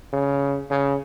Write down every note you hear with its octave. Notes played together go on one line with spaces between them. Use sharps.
C#3
C#3